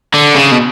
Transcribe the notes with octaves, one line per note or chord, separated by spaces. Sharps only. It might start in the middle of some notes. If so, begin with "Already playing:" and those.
D3
C#3
B2